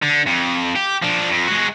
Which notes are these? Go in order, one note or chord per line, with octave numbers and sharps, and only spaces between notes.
D3
F2
G4
F3 D4
F2
G#3 F#4